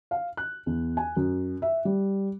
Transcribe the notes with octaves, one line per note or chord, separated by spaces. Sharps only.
F5
F#6
E2
G#5
F#2
E5
G3